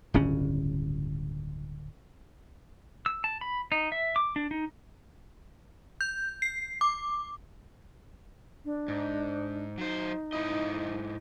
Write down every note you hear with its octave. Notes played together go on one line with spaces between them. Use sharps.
D1 G1 C#3 C#4
E6
A5
B5
D#4
E5
D6
D4
D#4
G6
C7
D6
D4
G#2
F#3 D#4 C5
G#2 E4 D#5